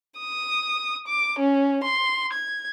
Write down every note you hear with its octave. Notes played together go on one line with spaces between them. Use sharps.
D#6
D6
C#4
C6
G#6